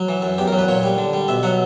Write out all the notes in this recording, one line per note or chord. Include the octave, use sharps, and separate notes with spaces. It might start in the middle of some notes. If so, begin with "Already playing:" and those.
Already playing: F#3
E3
F#2
E2 G4
A#4
F#3
B4
A#2 C#5
G3
D3
G3
B2 E5
F#3 F#5